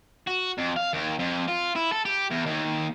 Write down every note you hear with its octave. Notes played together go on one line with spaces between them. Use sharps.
F#4
F2
F5
D#2
F2
F4
E4
A4
G4
E2
D#2